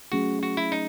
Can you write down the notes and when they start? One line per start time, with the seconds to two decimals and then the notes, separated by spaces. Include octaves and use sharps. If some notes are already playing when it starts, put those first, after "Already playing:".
0.12 F#3 A3 C#4 F#4 G#4
0.43 F#4
0.57 E4
0.72 D#4